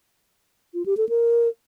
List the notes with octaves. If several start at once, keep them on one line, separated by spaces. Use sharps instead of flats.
F4
G4
A4
A#4